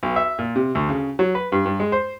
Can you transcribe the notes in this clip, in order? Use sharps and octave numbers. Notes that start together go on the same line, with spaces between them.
B1
E5
A#2
C3
D2
C#3
F#3
B4
G2
G2
G#3
C5